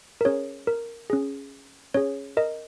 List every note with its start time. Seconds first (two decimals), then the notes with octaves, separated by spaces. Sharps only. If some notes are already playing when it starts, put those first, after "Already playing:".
0.21 A#4
0.25 C#4 G#4 C#5
0.67 A#4
1.10 C#4 G#4
1.94 C#4 G#4 C#5
2.37 A#4 D#5